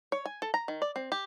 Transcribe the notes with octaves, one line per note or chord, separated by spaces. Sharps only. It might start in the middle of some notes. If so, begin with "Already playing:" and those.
C#5
G#5
A4
A#5
D#3
D5
C4
G4